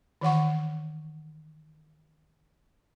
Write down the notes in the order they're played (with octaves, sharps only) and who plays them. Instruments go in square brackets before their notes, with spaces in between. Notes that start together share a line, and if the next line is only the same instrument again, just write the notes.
[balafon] D#3 E3 F#5 C#6